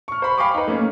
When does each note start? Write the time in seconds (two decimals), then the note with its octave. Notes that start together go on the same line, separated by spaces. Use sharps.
0.08 C#6 F6
0.22 C5 B5 C#6
0.38 F5 G5 G#5 B5 C#6 D6
0.55 D#4 B4
0.68 A3 A#3 C#4